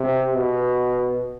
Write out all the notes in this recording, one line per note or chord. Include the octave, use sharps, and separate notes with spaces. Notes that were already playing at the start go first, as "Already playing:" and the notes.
Already playing: C3
B2